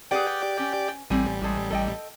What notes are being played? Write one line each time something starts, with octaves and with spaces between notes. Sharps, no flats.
G4 G#4 B4 D5 F#5 G5
C#4
A1 G3 C4 G#5
G#3 A4
A4 D#5 G5